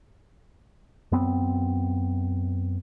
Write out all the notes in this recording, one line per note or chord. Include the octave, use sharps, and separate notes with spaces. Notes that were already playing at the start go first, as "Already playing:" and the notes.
F#2 B3 C4